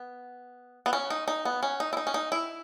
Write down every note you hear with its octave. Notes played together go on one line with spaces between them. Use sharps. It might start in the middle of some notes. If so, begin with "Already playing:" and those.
Already playing: B3
B3
C#4
D#4
D#4
B3
C#4
D#4
E4
D#4
C#4
D#4
E4